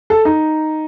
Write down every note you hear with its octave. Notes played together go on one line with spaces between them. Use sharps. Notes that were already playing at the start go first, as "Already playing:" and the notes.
A4
D#4